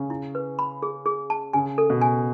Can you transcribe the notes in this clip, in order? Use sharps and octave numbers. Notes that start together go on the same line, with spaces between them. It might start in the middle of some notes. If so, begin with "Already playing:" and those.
Already playing: C#3
E4
B4
B5
G#4
G#4
A5
C#3 G#5
A4
B2
G#5